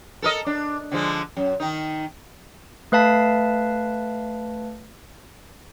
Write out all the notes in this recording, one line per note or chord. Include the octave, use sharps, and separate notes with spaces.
A4 A#4 D#5
D4
D3 F3 G#3
F#2
D#3 D#4
A3 B4 F5 A5 B6